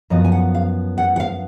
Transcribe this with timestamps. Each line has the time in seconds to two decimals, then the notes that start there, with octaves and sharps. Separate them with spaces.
0.10 F#2 F3 B3 D#5
0.25 G#5
0.32 F#5
0.55 F5
0.98 F#5
1.16 F#5
1.20 F5